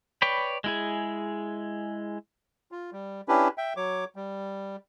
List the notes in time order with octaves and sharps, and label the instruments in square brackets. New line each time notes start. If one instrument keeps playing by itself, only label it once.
[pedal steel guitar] B4 C#5 D5 G5 B5
G#3 E4 G#4
[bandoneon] F4
G3
C#4 D4 E4 G4 B4
E5 G5
F#3 C#5 D6
G3